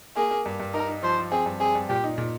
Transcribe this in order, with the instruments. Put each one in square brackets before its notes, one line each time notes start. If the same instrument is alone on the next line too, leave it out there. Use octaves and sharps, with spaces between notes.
[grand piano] A#3 [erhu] G#4
[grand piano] A#3
G2
G2
[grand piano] D#4 [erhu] A#4
[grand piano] D#4
[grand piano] F3 [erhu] C5
[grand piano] F3
[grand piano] C4 [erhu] G#4
[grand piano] G2
[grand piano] C4 [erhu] G#4
[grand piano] G2
[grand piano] A#2 [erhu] G4
[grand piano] D#4
A#2